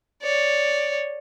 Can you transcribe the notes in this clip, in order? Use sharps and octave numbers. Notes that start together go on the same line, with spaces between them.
C#5 D5